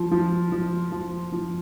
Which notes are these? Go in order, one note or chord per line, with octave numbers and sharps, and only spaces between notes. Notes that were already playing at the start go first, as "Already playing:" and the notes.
Already playing: F3
F3
F3
F3
F3